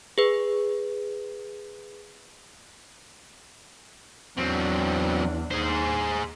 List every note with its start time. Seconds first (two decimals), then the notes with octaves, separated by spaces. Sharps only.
0.18 G#4 B4
4.38 E2 F#3 C4 D4
5.51 D#2 G#4 C5